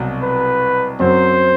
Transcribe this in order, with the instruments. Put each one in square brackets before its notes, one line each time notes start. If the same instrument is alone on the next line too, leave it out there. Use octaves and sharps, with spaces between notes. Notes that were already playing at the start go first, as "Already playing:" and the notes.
Already playing: [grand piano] C2 B2 F#3
[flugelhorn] B4
[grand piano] F#2 F#3 C4 [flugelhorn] C5